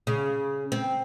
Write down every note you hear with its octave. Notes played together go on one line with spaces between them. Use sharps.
C#3
C4